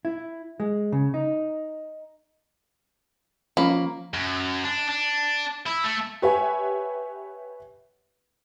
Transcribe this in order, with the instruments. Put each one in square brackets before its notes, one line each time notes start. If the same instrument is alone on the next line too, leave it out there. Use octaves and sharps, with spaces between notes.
[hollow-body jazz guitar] E4
G#3
C#3
D#4
[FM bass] F3 [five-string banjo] A#3 [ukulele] C#4 B5
[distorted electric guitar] F#2
D4
D4
E4
A3
[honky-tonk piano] G4 B4 C#5 E5 F#5 G#5